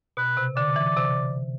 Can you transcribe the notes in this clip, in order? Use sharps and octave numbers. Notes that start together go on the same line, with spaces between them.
B2 B4
C3
D3 D5
E3
C3